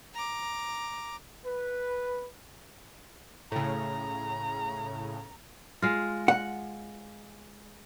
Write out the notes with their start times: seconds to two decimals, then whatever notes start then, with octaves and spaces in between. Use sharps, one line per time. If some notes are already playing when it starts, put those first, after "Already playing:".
0.14 A#5 D6
1.46 B4
3.52 A2 C#3 A#5
5.82 G#3 F4
6.28 F#5